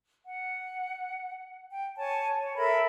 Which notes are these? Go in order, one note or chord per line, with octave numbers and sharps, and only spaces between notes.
F#5
G5
C#5 G#5 A5
C#5
A4 A#4 E5 B5